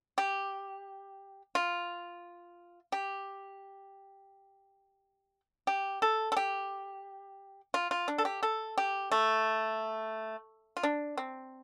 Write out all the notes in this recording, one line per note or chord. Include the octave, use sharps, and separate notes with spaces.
G4
F4
G4
G4
A4
A4
G4
F4
F4
D4
A4
G4
A4
G4
A3
F4
D4
C4